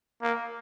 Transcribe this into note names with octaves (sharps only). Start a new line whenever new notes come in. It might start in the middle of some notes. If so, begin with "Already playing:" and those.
A#3